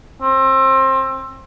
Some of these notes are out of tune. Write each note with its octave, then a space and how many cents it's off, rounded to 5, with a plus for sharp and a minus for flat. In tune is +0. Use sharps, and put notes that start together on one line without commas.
C4 +25